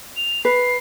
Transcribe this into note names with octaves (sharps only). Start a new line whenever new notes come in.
F7
B4 C7